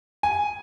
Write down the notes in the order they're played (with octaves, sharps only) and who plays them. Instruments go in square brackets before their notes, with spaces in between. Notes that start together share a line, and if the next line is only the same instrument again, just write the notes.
[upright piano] G#5